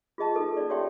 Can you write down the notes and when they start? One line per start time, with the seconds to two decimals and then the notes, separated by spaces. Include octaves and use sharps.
0.18 F4 G#4 D#5 A5
0.35 D#4 F4 A4 A#4 D#5
0.57 C#4 D5
0.70 F#4 G4 C#5 E5 G5 C6